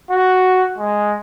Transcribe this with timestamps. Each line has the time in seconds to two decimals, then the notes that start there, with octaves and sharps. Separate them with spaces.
0.11 F#4
0.78 G#3